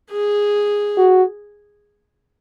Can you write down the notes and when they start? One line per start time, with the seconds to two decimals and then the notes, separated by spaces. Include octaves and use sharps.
0.11 G#4
0.97 F#4